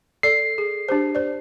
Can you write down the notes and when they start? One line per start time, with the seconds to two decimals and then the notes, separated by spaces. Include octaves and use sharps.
0.23 A4 D5 C7
0.58 G#4
0.89 D4 G4 C5
1.15 C5 D5